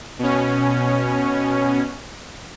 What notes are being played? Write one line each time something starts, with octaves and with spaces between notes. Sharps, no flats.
B2 C#4